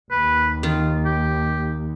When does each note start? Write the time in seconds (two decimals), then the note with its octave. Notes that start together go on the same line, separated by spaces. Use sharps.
0.11 D#2 B4
0.63 D#3 F4
1.05 G4